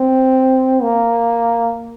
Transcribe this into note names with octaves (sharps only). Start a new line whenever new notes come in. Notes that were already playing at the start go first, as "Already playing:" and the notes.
Already playing: C4
A#3